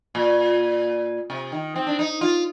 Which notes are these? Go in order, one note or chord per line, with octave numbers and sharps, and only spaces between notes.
A#2
C3
D#3
C4
D4
D#4
F4